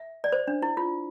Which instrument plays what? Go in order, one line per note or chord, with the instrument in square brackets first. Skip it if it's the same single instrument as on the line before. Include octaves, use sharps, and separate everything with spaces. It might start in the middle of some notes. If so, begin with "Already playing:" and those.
Already playing: [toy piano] E5
D5
C5
D4
E4
F4